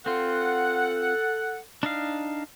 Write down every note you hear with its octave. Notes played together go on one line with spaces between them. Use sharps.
C4 F4 A4 F#5
D4 D#4 F5